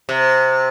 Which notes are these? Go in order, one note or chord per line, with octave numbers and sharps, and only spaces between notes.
C3